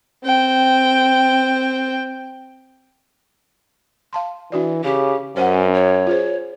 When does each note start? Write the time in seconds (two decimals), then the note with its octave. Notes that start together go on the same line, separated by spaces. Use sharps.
0.24 C4 G5
4.13 F5 A5 C6
4.52 E3 D4 F#4 D5
4.84 C#3 G4
5.37 F#2 C#4 C5 F#5
5.74 C#5
6.07 F4 G#4 C5